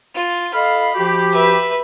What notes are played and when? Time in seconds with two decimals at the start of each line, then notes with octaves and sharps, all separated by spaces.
0.15 F4
0.54 A4 D#5 F5 B5
0.95 F3 F#4 G4
1.32 B4 E5